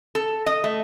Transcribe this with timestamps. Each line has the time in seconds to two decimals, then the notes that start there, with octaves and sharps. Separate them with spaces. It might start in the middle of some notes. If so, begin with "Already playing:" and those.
0.15 A4
0.46 D#5
0.64 A3